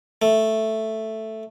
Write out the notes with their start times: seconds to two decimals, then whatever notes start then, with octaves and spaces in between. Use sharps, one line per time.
0.22 A3